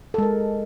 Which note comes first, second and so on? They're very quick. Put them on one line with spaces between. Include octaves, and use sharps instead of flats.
A4 G#3 A#4